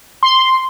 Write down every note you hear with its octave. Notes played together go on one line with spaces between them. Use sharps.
C6